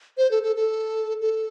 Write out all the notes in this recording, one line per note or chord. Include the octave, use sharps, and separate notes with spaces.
C5
A4
A4
A4
A4